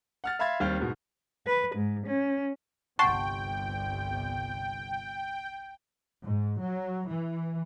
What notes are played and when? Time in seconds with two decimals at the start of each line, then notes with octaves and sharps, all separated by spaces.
0.24 F#5 F6 A6
0.39 E5 F5 B5 C6 G#6 A6
0.60 D#2 G3 C4 F6 G6
0.80 G#2 B2
1.47 B4
1.76 G#2
2.07 C#4
2.99 G1 C2 C3 F#5 G5 A5 C6 C#6
6.25 G#2
6.61 F#3
7.08 E3